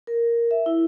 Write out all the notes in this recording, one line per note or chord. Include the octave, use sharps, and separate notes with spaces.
A#4
E5
E4